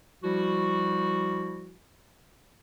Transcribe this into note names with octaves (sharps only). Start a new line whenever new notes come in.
F3 G3 E4 F#4